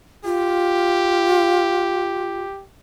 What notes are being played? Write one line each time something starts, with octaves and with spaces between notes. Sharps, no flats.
F4 G4